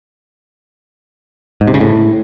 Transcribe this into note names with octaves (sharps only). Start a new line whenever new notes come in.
G#2
C3
C#3
A2